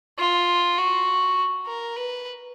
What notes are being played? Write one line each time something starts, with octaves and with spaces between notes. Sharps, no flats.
F4
F#4
A#4
B4